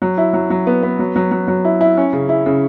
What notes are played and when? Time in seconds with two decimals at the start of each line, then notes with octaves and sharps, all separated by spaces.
0.02 F#3
0.18 E4
0.33 F#3
0.50 F#3
0.67 B3
0.83 B3
0.99 F#3
1.16 F#3
1.32 F#3
1.48 F#3
1.65 E4
1.81 E4
1.97 C#4
2.13 C#3
2.29 E4
2.46 C#3